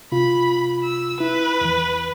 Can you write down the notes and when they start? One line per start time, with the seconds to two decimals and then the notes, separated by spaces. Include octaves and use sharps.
0.12 C3 F4 B5
0.84 E6
1.20 E4 B4
1.61 E2 E3